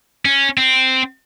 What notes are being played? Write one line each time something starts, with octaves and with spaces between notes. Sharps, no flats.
C#4
C4